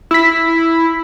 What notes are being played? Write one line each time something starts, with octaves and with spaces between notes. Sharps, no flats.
E4 E6 B6